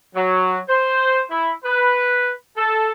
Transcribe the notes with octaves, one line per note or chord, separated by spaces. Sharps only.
F#3
C5
E4
B4
A4